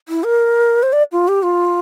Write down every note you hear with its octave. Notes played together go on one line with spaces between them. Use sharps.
E4
A#4
C5
D5
F4
G4
F4